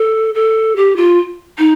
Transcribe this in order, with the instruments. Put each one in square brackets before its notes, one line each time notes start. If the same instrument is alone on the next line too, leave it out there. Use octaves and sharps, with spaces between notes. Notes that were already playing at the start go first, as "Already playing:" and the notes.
Already playing: [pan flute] A4
A4
G4
F4
D#4